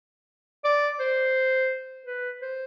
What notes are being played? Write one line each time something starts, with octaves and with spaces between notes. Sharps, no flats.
D5
C5
B4
C5